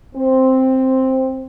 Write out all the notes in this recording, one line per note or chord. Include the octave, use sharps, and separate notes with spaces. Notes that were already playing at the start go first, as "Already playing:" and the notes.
C4